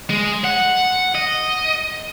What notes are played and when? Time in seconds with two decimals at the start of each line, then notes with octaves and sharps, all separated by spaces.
0.10 G#3
0.44 F#5
1.15 D#5